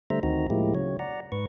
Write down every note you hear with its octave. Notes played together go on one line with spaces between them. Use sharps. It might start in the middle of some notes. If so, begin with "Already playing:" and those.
D3 G3 A3 C5 E5 A#5
D2 D#3 C4 D#4 F#4 A#5
A2 F3 G#3 A#3 E4 G4
C#3 F#3 C#5
D5 F#5 A#5
G#2 B4 C#6